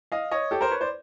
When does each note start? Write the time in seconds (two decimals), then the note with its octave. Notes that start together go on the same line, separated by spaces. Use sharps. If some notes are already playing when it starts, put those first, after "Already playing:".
0.12 D#5 F5
0.31 C#5 D#5
0.51 G4 A4
0.61 A#4 C5
0.71 B4 C#5
0.81 C5 D5